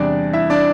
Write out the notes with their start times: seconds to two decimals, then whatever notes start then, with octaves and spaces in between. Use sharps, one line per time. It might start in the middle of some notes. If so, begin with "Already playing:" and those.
Already playing: E2 C3 G3 D4 D5
0.33 E4 E5
0.50 D4 D5